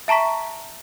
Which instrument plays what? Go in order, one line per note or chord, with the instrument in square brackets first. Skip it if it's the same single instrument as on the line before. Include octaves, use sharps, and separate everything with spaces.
[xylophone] E5 A5 A#5 C#6 B6